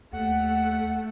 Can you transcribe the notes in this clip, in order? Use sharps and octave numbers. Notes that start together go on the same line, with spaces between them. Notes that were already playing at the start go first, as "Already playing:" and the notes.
D#2 A3 F#5